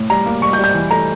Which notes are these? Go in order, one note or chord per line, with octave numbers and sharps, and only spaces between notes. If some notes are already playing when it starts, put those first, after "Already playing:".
Already playing: A2
G3 A#5
A#3
G3 C#6
G6
G3
G6
E3
A3 A#5